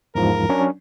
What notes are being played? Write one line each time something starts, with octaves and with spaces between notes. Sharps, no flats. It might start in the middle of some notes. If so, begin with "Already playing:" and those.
E2 G#2 F3 A#4
F#3 C#4 D4